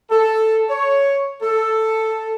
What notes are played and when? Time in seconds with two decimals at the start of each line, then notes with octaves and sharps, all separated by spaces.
0.11 A4
0.70 C#5
1.42 A4